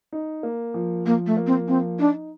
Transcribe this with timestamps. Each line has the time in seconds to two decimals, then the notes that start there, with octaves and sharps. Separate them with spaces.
0.12 D#4
0.43 A#3
0.74 F3
1.05 F3 A#3
1.27 A3
1.37 A#3
1.47 C4
1.68 F3 C4
1.99 D4 D#4